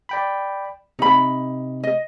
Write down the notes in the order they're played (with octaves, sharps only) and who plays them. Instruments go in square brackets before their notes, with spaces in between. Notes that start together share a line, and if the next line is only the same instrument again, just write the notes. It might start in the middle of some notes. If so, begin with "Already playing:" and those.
[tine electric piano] D5 G5 B5
[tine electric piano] C3 [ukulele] D#4 B5
[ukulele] D#5